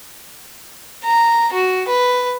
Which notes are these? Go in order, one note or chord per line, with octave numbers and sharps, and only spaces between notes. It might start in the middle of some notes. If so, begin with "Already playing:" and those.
A#5
F#4
B4